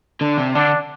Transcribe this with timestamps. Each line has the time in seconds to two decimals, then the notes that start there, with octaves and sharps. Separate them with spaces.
0.21 D3 D4
0.38 C3
0.55 D3 D4